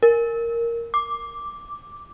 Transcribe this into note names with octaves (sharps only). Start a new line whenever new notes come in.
A#4
D6